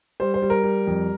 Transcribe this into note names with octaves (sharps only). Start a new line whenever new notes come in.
G3 C5
C5
G3
A#4
G3
F2